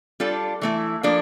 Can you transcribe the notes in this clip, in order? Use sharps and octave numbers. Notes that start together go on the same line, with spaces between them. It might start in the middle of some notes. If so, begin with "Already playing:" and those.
G3 D4 F4 A4
E3 A3 E4
F3 A#3 D4 A4